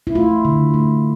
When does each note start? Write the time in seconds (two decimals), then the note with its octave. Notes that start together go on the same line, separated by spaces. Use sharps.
0.07 E4
0.15 A3 F4
0.45 D3
0.74 A3